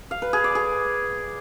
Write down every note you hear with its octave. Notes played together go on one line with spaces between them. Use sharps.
F5
B4
G#4
D5
G#4